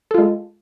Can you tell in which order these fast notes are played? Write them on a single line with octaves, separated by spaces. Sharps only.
A4 F4 G#3